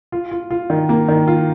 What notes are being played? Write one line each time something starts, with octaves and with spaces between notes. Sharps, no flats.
F4
F4
F4
D#3
A#3
D#3
F4